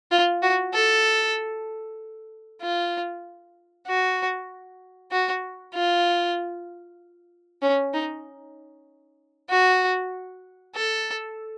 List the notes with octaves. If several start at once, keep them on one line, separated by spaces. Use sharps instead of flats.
F4
F#4
A4
F4
F#4
F#4
F4
C#4
D#4
F#4
A4